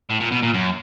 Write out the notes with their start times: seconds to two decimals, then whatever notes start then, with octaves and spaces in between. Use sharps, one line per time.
0.10 A2
0.20 A#2
0.32 B2
0.43 A#2
0.54 F#2